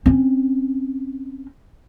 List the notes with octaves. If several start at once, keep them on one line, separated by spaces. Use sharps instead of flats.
C4 C#4